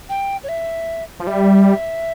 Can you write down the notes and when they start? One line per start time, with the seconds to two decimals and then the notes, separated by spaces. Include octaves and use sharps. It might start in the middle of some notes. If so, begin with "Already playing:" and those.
0.09 G5
0.43 C#5
0.49 E5
1.20 F3
1.27 G3 E5